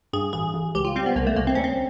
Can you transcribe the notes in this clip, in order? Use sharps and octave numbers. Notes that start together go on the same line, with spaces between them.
G2 G#4
A1 G#4
A1
C#2 G4
F4
G3 C4
B3
C2 A#3
A3
C2 A#3
C4
D2 C#4
C4